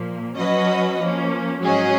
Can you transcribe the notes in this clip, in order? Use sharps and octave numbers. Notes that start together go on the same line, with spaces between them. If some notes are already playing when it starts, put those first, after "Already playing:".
Already playing: A#2 F3 A#3
F#3 C#4 F#4 B4 D#5
F3 A#3 C#4
G#2 F#3 C#4 G#4 D#5